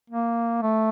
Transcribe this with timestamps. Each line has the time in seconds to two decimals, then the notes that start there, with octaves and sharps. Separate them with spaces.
0.10 A#3
0.62 A3